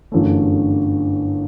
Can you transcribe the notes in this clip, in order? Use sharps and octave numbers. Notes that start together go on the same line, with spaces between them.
G1 F#2 E3 A3